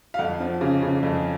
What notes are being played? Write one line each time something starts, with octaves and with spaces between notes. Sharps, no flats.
F5
F2 F#5
F3
C#3
C#3
F2